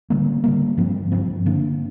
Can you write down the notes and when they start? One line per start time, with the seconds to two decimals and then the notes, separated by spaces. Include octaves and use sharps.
0.10 D3 G3 A#3
0.44 D3 G3 A#3
0.77 G2 F3 C4
1.12 G2 F3 C4
1.46 D3 A#3 D4